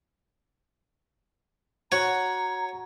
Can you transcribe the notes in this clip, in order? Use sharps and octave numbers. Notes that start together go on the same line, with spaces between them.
F#4 C#5 A#5